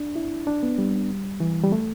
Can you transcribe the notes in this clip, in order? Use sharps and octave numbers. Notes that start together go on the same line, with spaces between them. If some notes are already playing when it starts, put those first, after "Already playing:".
Already playing: D4
E4
D4
B3
G3
E3
G3
A3